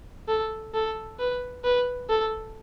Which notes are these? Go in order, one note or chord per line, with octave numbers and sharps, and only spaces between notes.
A4
A4
B4
B4
A4